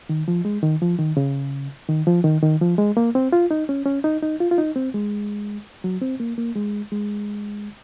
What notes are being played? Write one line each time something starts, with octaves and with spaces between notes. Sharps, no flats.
D#3
F3
G#3
D#3
F3
D#3
C#3
D#3
F3
D#3
D#3
F3
G#3
A#3
C4
F4
D#4
C#4
C#4
D#4
D#4
F4
F4
D#4
C4
G#3
F#3
C4
A#3
A#3
G#3
G#3